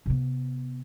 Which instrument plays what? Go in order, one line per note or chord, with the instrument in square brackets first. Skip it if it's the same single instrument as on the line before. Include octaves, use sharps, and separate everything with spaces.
[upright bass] C3 B3